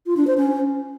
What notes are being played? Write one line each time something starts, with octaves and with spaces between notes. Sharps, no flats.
F4
D4
C5
C#4